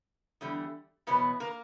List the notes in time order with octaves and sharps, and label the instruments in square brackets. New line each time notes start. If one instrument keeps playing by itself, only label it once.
[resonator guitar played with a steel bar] E2 D3 G3
E2 B2 F#3 B3 B4
A#3 A#4